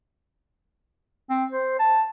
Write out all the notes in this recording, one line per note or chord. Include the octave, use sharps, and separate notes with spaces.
C4
C5
A5